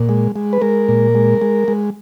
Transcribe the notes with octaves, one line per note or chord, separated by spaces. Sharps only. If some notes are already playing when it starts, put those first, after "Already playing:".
Already playing: A#2
G#3
G#3
B4
G#3 A#4
A#2
G#3
G#3
G#3